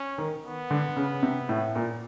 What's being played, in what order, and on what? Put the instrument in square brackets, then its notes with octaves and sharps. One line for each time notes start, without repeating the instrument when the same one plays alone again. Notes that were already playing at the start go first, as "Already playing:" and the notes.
Already playing: [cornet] C#4
[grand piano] D#3
[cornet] B3
[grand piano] D3
C#3
C3
A2
A#2